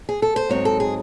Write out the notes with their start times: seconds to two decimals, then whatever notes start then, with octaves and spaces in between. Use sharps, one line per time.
0.09 G#4
0.22 A4
0.36 C5
0.49 G#2 F#3 C4 D#4 C#5
0.65 A4
0.80 G#4